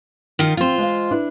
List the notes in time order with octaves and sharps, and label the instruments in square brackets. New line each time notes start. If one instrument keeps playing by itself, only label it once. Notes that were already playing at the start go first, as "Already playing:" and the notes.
[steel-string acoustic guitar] D#3 D#4 F4
[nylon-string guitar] F3 C4 [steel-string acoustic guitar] F4 C5
[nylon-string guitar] G#3 D#5 F5
D4 E4 B4